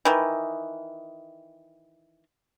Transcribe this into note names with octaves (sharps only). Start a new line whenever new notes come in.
D#3 E3